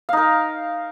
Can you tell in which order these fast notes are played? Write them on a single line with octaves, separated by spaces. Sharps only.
F5 D#4 A#4